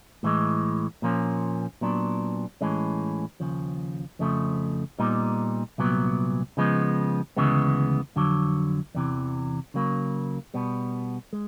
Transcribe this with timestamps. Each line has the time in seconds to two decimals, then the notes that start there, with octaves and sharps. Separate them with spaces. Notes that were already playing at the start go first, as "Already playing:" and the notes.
0.23 A2 E3 G#3
1.02 A#2 F3 A#3 C#4
1.81 A#2 F#3 B3 D4
2.61 A2 E3 G#3 C#4
3.40 D#2 C#3 F3
4.19 F2 C#3 F3 A3
4.99 A#2 G3 B3 D#4
5.78 C2 A#2 F#3 B3
6.57 C#3 F3 G#3 B3
7.37 D2 C#3 E3 G#3 B3
8.16 F2 D3 F#3
8.95 E2 C3 E3
9.74 C#3 F#3 A#3
10.54 B2 G3 B3
11.33 G#3